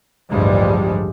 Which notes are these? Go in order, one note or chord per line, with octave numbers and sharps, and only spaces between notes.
A1 D2 G2 F3 G3 G#3